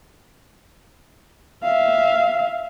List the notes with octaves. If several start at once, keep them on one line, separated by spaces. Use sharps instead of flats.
E5 F5